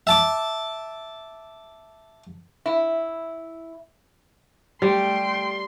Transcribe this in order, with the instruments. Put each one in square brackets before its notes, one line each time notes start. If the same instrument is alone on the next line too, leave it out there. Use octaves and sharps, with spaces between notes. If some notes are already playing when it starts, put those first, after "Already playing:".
[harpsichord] E5 A5 D6
[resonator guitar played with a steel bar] E4
[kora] G3 [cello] A3 G5 [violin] C6